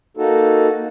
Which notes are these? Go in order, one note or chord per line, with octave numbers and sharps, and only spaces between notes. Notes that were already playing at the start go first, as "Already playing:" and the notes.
A#3 D#4 F#4 A4